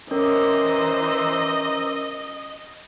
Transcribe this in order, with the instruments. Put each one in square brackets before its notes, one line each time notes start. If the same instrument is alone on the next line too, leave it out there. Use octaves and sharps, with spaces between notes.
[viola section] E3 C5 [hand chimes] C#4 A#4 [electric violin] D#5 [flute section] A#5 D6 E6